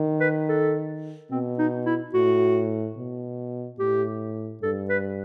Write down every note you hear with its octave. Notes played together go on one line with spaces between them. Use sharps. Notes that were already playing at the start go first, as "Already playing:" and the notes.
Already playing: D#3
B4
A4
B2 C4
D#4
E4
A2 F#4
B2
A2 G4
G2 A4
B4